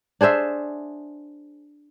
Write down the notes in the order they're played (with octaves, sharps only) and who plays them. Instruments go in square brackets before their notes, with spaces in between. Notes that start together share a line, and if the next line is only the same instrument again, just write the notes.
[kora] D4 G#4 C5 E5